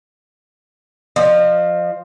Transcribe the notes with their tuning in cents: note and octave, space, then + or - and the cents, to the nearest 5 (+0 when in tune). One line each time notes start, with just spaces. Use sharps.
F3 +0 D#5 -35